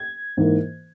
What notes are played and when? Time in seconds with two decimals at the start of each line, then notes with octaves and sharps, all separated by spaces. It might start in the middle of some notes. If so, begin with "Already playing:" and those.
Already playing: G#6
0.37 G#2 E3 A#3